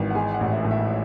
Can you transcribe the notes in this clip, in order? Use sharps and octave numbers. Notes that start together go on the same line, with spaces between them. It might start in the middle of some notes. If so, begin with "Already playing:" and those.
Already playing: G#1 E3
F#5
G#3 G#5
F#5
A1
E5
A2
E5